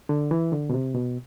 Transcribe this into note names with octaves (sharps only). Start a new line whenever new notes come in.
D3
E3
D3
B2
C3
B2